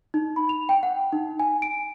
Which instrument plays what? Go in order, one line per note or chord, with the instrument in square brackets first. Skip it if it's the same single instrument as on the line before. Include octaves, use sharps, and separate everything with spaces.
[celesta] D#4
B5
F7
G5
F#5
D#4
G#5
D7